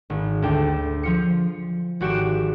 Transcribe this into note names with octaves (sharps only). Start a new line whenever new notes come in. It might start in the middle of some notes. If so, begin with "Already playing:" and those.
G#1
D2 D4 G5
F3 F4 C#7
G#1 F#4 G4 D7 E7